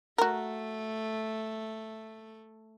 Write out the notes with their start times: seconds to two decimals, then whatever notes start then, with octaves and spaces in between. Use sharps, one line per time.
0.18 A3 F#4 A#4